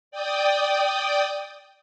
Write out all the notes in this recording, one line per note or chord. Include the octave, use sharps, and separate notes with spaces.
D5 G5 D#6